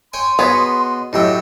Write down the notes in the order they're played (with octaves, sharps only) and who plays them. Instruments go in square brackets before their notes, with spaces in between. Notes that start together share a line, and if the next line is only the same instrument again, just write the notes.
[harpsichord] C#5 G5 G#5 [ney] C6
[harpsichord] B2 G#4 B5 [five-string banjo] B3 C#5
[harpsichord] A2 F#3 G5 [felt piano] E4 G4 E6 [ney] D#5